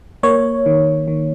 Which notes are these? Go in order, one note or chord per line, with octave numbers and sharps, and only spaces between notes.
A#3 C#5
D#3
D#3